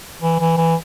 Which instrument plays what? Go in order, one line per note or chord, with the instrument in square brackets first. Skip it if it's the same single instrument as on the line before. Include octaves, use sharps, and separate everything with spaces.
[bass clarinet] E3
E3
E3